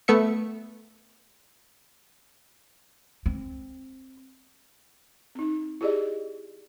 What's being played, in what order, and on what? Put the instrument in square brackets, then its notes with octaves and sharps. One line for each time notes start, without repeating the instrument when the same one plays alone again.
[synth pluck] A3 B3 E5 C#7
[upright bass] C4
[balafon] C4 D#4
E4 G4 G#4 D5 D#5